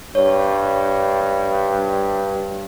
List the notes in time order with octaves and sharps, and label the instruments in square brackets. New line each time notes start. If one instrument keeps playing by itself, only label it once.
[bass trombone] G2 [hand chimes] C#5